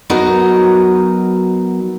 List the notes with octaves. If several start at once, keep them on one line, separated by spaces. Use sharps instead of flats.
F#3 B3 D#4 F#4 A#4 D#5